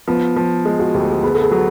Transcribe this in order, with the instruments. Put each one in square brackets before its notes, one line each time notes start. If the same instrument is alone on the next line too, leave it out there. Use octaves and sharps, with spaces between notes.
[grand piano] F3 [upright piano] B3
[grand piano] F3
G#3
[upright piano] F#4
[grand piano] D2 [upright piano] G4
[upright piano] G#4
[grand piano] B3 [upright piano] G#4
[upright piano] A4
G#4
[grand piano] F#3